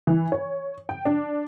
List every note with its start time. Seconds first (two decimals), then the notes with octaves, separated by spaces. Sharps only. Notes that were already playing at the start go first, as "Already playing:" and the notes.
0.07 E3
0.32 C#5
0.89 G5
1.05 D4